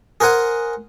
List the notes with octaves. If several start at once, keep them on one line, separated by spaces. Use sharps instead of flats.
G#4 A#4 C5 F#5 G#5